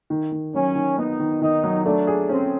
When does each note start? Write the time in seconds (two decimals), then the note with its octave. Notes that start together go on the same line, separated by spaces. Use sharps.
0.10 D#3
0.32 D#3
0.54 F#3 C#4
0.75 D#3
0.98 B3 D#4
1.19 D#3
1.42 D#3 D#4
1.64 F#3
1.85 A3 D4
2.07 G#4
2.29 C4 C#4